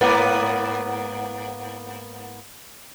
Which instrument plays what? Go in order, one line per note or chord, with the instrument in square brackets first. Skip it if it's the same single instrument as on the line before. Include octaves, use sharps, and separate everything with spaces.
[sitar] G#2 A#3 B3